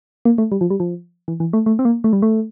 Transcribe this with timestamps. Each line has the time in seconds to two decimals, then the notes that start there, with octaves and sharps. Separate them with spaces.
0.25 A#3
0.38 A3
0.52 G3
0.61 F3
0.70 G3
0.80 F3
1.28 E3
1.40 E3
1.53 A3
1.66 A3
1.79 C4
1.85 A#3
2.04 A3
2.13 G3
2.22 A3